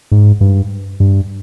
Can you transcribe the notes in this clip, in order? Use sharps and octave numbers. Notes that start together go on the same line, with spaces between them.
G#2
G2
G2